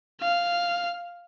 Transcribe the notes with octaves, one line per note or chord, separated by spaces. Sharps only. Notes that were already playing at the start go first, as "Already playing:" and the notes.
F5